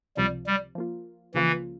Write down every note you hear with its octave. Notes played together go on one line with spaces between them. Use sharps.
C#2 C3 F3 G3
G3
F3 A#3 F4
C#2 C#3 E3 F3 A#3 F4